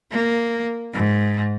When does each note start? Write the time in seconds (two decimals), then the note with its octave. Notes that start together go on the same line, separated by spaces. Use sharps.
0.11 A#3
0.94 G#2